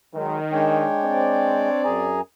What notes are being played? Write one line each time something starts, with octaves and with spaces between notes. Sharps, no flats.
D#3 F#3 G#3
G#3 D4 C#5 G5
C4 D5
F#2 G#4 G#5 A#5